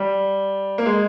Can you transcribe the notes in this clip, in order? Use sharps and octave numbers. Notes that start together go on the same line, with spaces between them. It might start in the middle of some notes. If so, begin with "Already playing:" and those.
Already playing: G3
A#3
G#3